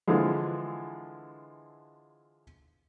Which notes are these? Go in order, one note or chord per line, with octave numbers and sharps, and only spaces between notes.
D3 E3 F3 G#3